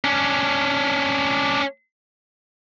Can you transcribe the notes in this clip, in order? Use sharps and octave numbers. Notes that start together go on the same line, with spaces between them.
C#4 D4